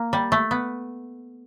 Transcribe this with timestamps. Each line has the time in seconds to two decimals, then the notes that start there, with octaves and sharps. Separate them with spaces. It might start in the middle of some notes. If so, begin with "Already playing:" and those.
Already playing: A#3
0.13 G3
0.32 A3
0.51 B3